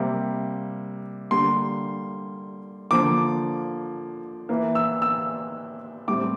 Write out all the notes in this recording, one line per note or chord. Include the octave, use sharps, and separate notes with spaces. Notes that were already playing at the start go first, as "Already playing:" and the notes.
Already playing: C3 G3 A#3
D3 G3 A#3 C6
D3 F3 A#3 D6
E3 A#3
E6
E6
A2 G3 C4 D6